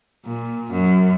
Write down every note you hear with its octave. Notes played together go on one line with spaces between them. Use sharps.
A#2
F#2